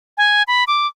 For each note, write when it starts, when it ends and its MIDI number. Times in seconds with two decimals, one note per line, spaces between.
0.18 0.43 80
0.47 0.64 83
0.67 0.87 86